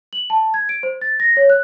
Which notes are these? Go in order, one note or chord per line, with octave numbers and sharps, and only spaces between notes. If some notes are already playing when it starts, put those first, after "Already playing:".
F#7
A5
G#6
D7
C5
A6
A#6
C#5
F#6